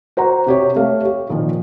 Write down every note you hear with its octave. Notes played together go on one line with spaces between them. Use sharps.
F#4 C5 F#5 A#5
C3 G4 C#5
A3 G4 A4 C#5 F5
G4 C#5
A#2 D#3 F3 F4